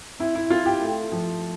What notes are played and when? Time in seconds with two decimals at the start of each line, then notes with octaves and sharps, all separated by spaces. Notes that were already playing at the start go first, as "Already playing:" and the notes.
0.19 C4 E4
0.35 E4
0.50 C4 F4
0.66 G4
0.81 A3
1.12 F3